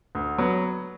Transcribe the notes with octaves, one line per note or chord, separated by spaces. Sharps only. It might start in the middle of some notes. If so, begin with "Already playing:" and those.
D2
F#3 B3